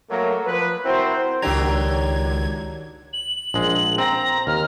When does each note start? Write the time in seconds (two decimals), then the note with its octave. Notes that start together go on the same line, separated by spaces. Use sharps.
0.11 F#3 A3 A#3
0.46 F3 B4
0.84 C4 E4 F#4 A#4 C5
1.42 C#2 D#3 F#3 D4 G4 A#5 G#6
3.13 F#7
3.54 A#1 G#3
3.98 C4 A#5
4.47 D#2 F6